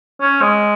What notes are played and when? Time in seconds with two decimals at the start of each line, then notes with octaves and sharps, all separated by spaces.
0.21 C#4
0.41 G#3